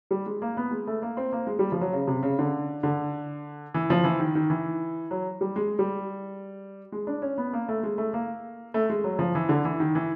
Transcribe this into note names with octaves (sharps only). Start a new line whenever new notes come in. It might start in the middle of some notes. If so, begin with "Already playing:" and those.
G3
G#3
A#3
B3
G#3
A3
A#3
C4
A#3
G#3
G3
F3
F#3
C#3
C3
C#3
D3
D3
E3
F3
E3
D#3
D#3
E3
F#3
G3
G#3
G3
G#3
D4
C#4
B3
A#3
A3
G#3
A3
A#3
A3
G#3
F#3
F3
E3
D3
E3
D#3
E3